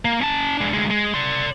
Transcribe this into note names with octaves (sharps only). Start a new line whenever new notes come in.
A#3
C#4 A5
G#3 D4
D2 G#3
G#3
D5 C6